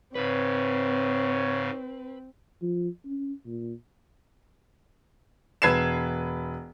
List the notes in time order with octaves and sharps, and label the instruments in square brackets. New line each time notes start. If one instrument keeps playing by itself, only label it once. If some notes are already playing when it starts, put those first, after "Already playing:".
[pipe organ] G#2 C#3 [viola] C4 [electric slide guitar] B4 [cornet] C#5
[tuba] F3
C#4
A#2
[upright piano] E1 B4 G#6 C7 E7